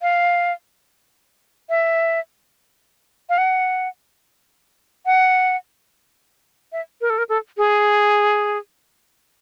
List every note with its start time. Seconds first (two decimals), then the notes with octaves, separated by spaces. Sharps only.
0.02 F5
1.69 E5
3.29 F5
3.38 F#5
5.06 F#5
6.72 E5
7.01 A#4
7.10 A4
7.18 A#4
7.29 A4
7.57 G#4